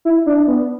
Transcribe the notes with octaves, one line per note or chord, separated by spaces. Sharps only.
E4
D4
B3